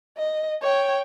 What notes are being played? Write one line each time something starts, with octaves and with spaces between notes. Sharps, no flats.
D#5
C#5 G5